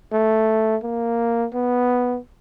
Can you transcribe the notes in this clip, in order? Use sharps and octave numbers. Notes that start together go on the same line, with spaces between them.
A3
A#3
B3